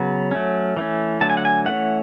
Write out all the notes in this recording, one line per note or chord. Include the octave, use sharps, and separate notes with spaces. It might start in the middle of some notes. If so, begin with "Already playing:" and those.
Already playing: C#3 F#3 B3
F#3 A3 C#4
E3 A3 C#4
D3 F#3 A3 A5
G#5
F#5
G#5
E3 A3 C#4 F#5